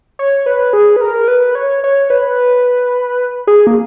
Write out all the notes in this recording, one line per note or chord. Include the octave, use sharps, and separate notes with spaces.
C#5
B4
G#4
B4
A#4
B4
C#5
C#5
B4
G#4
A#3